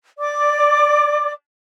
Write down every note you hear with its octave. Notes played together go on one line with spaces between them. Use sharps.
D5 D6